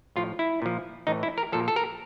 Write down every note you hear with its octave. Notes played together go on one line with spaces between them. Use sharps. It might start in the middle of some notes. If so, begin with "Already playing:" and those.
A2 F3 F4
E4
A#2 F3
A2 E3 D#4
E4
A#4
A#2 F3 A4
A4
A#4